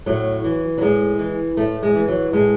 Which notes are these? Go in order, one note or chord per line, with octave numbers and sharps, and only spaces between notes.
A2 F#3
E3
F#3
A2 G#3
E3
A2 A3
G#3
E3
F#3
A2 G#3